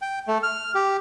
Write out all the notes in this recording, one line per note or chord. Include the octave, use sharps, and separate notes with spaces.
G5
A3
F6
G4